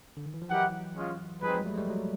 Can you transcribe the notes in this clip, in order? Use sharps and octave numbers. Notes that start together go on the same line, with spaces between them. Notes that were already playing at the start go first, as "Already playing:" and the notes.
D3
D#3
E3
F3
E3 F#3 E4 G4 A#4 D#5 F#5
G#3 C#4 F4
F3 G3 C4 D#4 G#4 B4
F#3 G#3
G3 A3
G#3
G3 A3
F#3 G#3